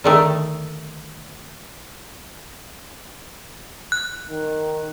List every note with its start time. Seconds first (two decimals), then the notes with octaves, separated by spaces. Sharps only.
0.04 D3 D#3 A3
3.92 F#6
4.30 D#3